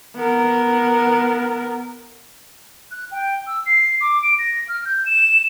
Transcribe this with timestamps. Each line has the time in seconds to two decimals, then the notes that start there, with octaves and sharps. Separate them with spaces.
0.16 B3 A#4
2.91 F#6
3.12 G5
3.47 E6
3.66 C7
4.01 D6
4.23 D7
4.39 A#6
4.69 F6
4.85 G6
5.06 E7